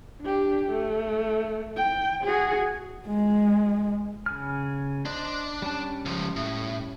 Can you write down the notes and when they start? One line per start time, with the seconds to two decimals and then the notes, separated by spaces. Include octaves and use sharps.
0.21 D4 G4
0.71 A3
1.77 G5
2.24 F#4 G#4
3.07 G#3
4.26 C#3 G#4 F6
5.05 D4 C5 D#5
5.62 G3 C#4 A5
6.06 C#2 F3
6.36 A2